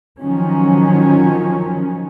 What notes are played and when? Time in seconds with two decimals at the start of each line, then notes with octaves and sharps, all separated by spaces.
0.22 D#3 F3 F#3 C#4